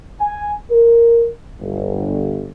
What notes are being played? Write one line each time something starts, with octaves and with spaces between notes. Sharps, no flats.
G#5
A#4
G1